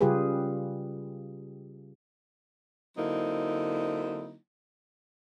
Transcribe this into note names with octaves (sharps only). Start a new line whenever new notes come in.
C#3 G3 F4 G4 G#4 B4
D3 F#3 A#3 C4 D#4 E4